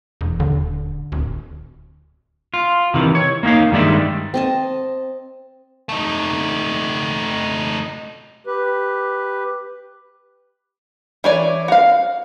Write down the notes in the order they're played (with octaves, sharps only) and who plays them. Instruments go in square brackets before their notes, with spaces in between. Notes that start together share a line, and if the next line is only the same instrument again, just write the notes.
[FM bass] E1
[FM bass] D#1 [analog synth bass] D3
[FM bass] D1
[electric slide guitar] F4
C3 D#3 E3
C#5
A#3 C#4 D#4 F5
G2 D#3 G3 G#3 D5 E5
[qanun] C4 D#5 A5
[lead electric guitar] A3 D#4
[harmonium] G4 B4
[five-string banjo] E3 C#5 D5
F#4 F5